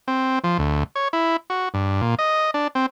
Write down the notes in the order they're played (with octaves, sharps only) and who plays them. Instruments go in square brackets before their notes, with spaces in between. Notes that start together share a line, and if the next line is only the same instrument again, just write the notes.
[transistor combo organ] C4
F3
D2
C#5
E4
F#4
G2
A#2
D#5
D4
C4